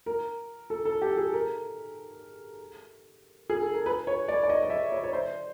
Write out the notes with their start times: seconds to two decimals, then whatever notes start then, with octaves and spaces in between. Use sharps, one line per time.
0.06 A#4
0.70 A4
0.85 A4
1.02 G4
1.17 G#4
1.33 A#4
3.50 G#4
3.62 A4
3.74 A#4
3.86 B4
4.07 C#5
4.28 D5
4.43 D5
4.50 D#5
4.63 D#5
4.70 E5
4.92 C#5
5.04 C#5
5.13 C5